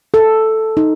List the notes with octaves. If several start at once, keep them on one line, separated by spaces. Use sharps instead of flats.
A4
D#4